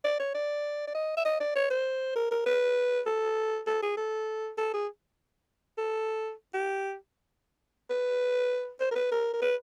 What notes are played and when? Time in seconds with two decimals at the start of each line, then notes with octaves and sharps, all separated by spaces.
0.04 D5
0.20 C#5
0.35 D5
0.88 D5
0.95 D#5
1.17 E5
1.25 D#5
1.40 D5
1.55 C#5
1.71 C5
2.16 A#4
2.31 A#4
2.46 B4
3.06 A4
3.67 A4
3.82 G#4
3.97 A4
4.58 A4
4.73 G#4
5.78 A4
6.54 G4
7.90 B4
8.80 C5
8.91 A#4
8.95 B4
9.12 A#4
9.34 A#4
9.42 B4